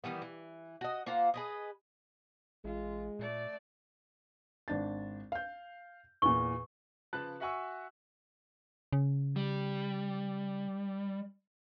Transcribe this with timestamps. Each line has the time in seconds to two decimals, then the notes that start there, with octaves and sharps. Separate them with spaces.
0.04 D#3 E3 G3 B3
0.22 E3
0.81 F#4 D#5
1.06 A#3 F4 C5 F#5
1.34 G#4 B4 D#5
2.64 A1 G#3 F4
3.19 A#2 A3 D5
4.68 G#1 D4 A6
5.32 F5 G6
6.22 E2 A#2 C#6
7.13 C#3 F3 B4 A5 F#6
7.40 F#4 E5 F#5 G#5 C#6 E6
8.93 C#3
9.36 G3